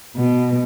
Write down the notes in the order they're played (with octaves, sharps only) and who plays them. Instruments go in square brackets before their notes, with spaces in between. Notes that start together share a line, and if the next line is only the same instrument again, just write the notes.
[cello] B2